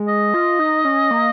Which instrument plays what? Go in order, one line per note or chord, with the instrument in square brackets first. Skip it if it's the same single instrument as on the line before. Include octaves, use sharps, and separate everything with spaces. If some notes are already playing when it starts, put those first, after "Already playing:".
Already playing: [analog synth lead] G#3
[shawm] D#5
[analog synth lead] F4
D#4
C#4
A#3